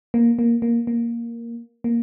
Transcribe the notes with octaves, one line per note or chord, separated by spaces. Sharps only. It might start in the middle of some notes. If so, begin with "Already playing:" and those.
A#3
A#3
A#3
A#3
A#3